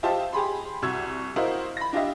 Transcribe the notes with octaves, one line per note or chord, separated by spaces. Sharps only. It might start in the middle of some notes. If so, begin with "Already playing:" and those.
F4 G4 C5 D#5 E5 A5
G4 G#4 B5 C6
C2 F#4 C#6 E6 G#6
E4 F#4 A#4 C5 D#5 F5
B5 A#6
D4 F4 G4 D#5 E5